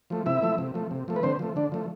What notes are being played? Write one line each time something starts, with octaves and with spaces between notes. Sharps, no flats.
F3 A3
C3 E4 E5
F3 A3
C3
F3 A3
C3
F3 A3
B4
D3 C4 C5
F3 A3
D3 D4
F3 A3